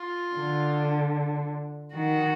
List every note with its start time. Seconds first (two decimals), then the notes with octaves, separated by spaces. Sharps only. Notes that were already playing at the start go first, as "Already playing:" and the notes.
Already playing: F4
0.36 D3
1.95 D#3 F#4